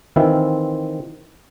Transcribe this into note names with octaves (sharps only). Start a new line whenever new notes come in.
D#3 E3 C4 E4 F4